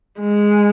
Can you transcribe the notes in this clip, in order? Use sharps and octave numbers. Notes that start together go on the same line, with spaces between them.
G#3